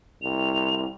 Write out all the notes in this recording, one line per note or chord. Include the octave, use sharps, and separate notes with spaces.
C2 F7